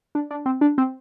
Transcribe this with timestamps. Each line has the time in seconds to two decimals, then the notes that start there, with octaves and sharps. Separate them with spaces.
0.15 D4
0.31 D4
0.46 C4
0.61 D4
0.78 C4